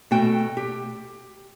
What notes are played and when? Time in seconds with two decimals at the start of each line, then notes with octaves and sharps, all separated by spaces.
0.11 B2 A3 F#4 G5
0.57 G4